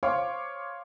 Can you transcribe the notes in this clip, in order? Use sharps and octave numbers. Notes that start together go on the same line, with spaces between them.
C5 C#5 F5 C6 D6